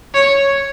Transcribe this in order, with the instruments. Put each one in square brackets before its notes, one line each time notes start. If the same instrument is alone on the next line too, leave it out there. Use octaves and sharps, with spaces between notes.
[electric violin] C#5